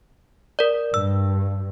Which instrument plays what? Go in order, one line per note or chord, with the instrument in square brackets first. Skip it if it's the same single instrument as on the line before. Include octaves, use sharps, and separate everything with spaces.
[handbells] A#4 D5
[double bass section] G2 [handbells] E6